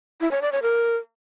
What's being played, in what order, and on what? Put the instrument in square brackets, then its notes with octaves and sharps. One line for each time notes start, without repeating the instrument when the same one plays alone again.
[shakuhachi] E4
C#5
D5
C#5
A#4